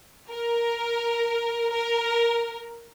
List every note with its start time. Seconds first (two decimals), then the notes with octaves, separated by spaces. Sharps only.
0.29 A#4
1.71 A#4